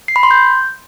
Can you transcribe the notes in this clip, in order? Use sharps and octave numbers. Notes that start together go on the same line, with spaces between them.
C7
B5
C6
G6